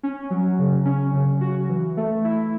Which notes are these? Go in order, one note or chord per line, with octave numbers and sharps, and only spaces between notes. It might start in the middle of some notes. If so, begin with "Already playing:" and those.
C#4
F#3
C#3
C#4
C#3
F#4
E3
A3
E4